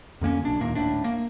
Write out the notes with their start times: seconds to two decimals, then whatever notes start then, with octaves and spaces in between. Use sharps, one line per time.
0.21 F2 D3 A#3 C#4
0.42 D1 B1 D4
0.60 D#2 A#2 A#3
0.75 D#1 A2 D4
1.04 A#3